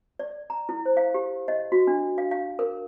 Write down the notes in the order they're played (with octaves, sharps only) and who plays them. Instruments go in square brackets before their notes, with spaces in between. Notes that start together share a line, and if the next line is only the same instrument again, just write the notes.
[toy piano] D5
A#5
E4
C5
F5
G4
D#5
F#4
D4
F5
F5
A#4